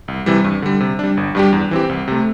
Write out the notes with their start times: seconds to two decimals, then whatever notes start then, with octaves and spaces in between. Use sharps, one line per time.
0.08 C2
0.26 C3 E3 G3
0.44 G2
0.62 D3 G3
0.80 C3
0.99 G3 D4
1.17 G1
1.35 G2 G3 D4 G4
1.53 E2
1.71 E3 C4 G4
1.89 C2
2.08 C3 A3